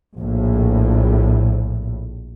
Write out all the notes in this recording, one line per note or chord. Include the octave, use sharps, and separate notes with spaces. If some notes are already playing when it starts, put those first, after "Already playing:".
A#1 A2